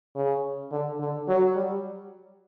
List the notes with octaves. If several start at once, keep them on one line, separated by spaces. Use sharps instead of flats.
C#3
D3
D3
F#3
G3